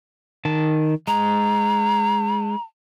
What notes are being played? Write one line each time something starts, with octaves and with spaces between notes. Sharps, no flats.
D#3 A5
G#3 A#5